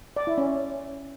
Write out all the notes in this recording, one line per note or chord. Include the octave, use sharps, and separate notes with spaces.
D5
E4
C#4